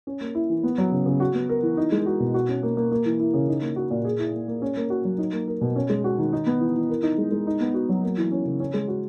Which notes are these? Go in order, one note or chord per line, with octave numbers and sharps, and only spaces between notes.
C#4
A#3
E4
E3
B3
F#3
C#3
C#3
F#4
B3
A#4
E3
D#4
G#3
F#4
B2
F#4
C#4
A#3
A#3
A#3
E3
E4
C#3
D#4
A#3
F#4
A#2
G#4
E4
A#3
A#3
C#4
A#3
F#4
F#3
D#4
A#3
A#4
B2
C#4
G#3
F#4
D#3
D#4
B3
E3
E3
A#4
D#4
G#3
G#3
D#4
B3
F#4
F#3
A#3
E3
C#4
C#3
C#4
G#3
F#4